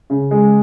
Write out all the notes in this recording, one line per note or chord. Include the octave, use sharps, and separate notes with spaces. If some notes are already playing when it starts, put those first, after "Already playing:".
C#3
G#3